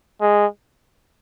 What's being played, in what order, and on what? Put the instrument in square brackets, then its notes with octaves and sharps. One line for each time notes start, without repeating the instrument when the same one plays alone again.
[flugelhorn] G#3